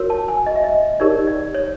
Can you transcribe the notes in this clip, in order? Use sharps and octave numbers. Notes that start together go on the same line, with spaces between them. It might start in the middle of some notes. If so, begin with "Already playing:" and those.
Already playing: F#4 A#4 C#5
A5
G#5
D#5
E5
D#5
D#4 G4 A#4 C#5 D5
D5
C#5